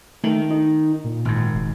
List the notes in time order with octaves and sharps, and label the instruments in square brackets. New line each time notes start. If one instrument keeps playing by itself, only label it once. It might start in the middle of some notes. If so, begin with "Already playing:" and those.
[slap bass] D#3 [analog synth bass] A3
[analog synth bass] D#4
A#2
[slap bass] G#1 G#2
[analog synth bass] F1